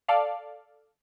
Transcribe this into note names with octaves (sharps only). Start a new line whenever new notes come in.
A4 D5 F5